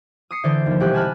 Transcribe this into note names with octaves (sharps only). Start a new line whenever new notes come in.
D#6 C7 C#7
D3 E3 C5 D5
D#2 F3
E1 C2 G4 F#6
G#5 A5 B5 F6 F#6